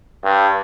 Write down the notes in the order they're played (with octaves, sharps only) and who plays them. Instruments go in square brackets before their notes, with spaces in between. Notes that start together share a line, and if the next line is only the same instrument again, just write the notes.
[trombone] G2